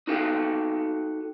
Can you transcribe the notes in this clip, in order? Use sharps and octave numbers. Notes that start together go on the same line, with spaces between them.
D#4 F#4 A4 F5 G5